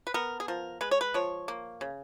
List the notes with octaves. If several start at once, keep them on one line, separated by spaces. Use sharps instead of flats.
B4
B3 A#4
G#4
F3 A#4
G#3 B4
C#5
B4
F3 C#5
A#3
C#3